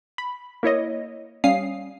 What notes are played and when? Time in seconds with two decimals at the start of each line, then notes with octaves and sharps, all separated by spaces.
0.18 B5
0.63 A#3 E4 C#5 D#5
1.44 G3 C#4 F5 D#6 C7